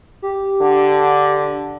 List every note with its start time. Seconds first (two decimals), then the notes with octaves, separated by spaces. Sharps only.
0.22 G4
0.61 D3